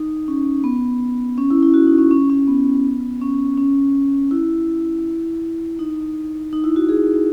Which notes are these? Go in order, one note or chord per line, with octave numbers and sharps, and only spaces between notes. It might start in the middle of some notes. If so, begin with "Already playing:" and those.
Already playing: D#4
C#4
B3
C#4
E4
E4
F#4
D#4
C#4
C#4
C#4
B3
C#4
C#4
E4
D#4
D#4
E4
F#4
G#4